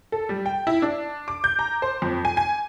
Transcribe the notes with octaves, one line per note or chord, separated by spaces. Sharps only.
A4
G3
G5
E4
D4
D6
G6
A#5
C5
F2
G#5
G#5